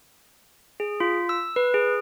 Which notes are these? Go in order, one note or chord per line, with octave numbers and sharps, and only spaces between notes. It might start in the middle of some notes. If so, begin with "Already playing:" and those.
G#4
F4
E6
B4
G#4